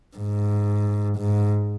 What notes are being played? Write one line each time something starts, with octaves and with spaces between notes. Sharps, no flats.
G#2
G#2